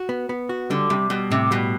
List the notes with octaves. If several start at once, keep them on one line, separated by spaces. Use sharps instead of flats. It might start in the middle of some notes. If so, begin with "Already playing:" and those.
Already playing: F#4
B3
B3
F#4
D3 G3
C3 G3
B2 G3
A2 C3
B2 G3